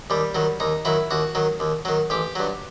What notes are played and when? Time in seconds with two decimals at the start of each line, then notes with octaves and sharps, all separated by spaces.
0.10 D#2 G3
0.35 D#3 F#3
0.60 D#2 D#4
0.85 D#3 F#3 E4
1.11 D#2 F#4
1.35 D#3 F#3
1.60 D#2
1.85 D#3 F#3
2.10 A1 G4
2.36 G2 F#3